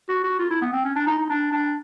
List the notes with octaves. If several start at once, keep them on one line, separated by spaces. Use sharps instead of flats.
F#4
F#4
F4
E4
B3
C4
C#4
D4
D#4
D#4
D4
D4